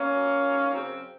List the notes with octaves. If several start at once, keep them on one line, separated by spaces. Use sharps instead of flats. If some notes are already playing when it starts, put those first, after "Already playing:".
Already playing: A#3 C#4
A#2 F#3
G#2 F#3
F#2 C#3 F#3 C4